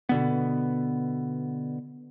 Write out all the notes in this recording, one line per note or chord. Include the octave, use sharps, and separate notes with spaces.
B2 D3 B3